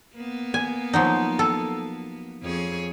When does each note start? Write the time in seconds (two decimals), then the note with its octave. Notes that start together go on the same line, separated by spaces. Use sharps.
0.14 A#3 B3
0.54 G#5
0.94 F3 F#3 D#4
1.39 A4
2.42 F2 G#4 C#5